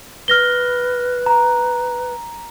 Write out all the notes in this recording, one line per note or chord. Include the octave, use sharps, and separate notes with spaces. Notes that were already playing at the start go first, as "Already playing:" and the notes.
B4 F6 A#6 G7
A#5